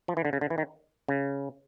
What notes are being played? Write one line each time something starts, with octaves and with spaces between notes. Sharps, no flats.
F3
E3
D3
C#3
D3
E3
D#3
C#3